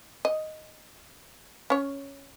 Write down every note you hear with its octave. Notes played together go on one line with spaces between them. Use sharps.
D#5
C#4 C#5